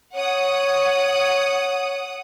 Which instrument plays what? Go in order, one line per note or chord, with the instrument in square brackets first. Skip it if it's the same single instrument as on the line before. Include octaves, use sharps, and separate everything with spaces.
[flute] C#5 [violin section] F#5 D#6